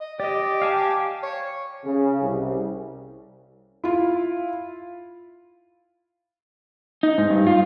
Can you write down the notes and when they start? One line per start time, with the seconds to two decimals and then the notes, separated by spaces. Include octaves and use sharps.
0.01 D#5
0.20 G4 D5 D#5
0.62 F5 G#5 A5
1.23 C#5
1.84 C#3
2.21 C2
3.84 E4 F4
7.03 D#4
7.18 G#2
7.30 G2
7.47 F4